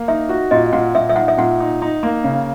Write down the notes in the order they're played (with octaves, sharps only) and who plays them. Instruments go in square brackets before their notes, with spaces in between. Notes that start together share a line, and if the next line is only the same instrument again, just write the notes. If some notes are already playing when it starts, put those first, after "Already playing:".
Already playing: [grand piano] A#3
[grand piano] D#4 [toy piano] E5
[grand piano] F#4
[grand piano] A#2 [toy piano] D#5
[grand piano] A#2 [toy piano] F#5
[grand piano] A#2 [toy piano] E5
[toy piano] E5
[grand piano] D#4 [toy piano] F#5
[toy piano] E5
[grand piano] A#2 [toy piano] F#5
[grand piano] D#4
D#4
A#3
C#3